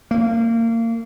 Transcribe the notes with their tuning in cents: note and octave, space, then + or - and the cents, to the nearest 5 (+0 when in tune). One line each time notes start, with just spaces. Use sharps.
A#3 -30